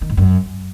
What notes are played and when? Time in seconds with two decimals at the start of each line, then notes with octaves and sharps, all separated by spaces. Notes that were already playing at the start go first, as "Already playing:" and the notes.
0.02 D#3
0.09 G#2
0.17 F#2